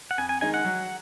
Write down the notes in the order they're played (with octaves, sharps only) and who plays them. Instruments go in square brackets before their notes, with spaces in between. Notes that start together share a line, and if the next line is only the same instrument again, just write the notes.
[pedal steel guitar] F#5
[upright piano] F2 [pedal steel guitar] G#5
[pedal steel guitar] G#5
[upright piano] D#3 G#3 D#4 [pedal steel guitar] G#5
[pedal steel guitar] F#5
[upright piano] F#3